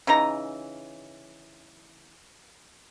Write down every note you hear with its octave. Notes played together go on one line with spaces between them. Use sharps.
C#3 E3 D#4 A#5